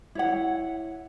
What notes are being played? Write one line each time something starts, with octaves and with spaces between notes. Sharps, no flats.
E4 C#5 F#5